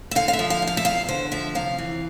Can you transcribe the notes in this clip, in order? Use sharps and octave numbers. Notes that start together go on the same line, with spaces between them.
E5
D3 F5
F5
E5
F3
F5
E2
F5
E5
E2 F5
D3 C5
F3 E5
C3 F5
E3